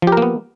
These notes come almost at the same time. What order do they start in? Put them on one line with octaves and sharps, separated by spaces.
F3 G4 A#4 A#3 B3